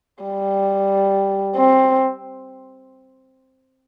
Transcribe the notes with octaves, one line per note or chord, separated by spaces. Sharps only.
G3
C4